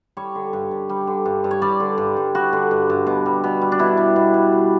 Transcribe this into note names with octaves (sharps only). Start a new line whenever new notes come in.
G3 C#5
D3
G2
G2
G3
D3
G2
G2
C#5
G3 D5
D3
G2
G2
G3 F#4
D3
G2
G2
B2
G3
B2
G3
D4
B2 E4
G3
B2
G3
B2